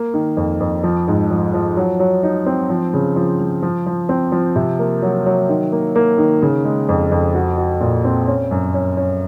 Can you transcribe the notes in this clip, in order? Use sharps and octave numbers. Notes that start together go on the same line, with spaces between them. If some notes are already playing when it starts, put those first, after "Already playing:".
Already playing: A#3
D#3
F2
F2
F3
G#2
F3
F3
F#3
F#3
D#4
C4
F3
C#3
F3
F3
F3
F3
C4
F3
C3
A#3
F#3
F#3
D#3
A#3
A#3
D#3
C#3
G#3
F2
F2
F#4
F#4
A#2
C4
C#4
F#2
C#4
C#4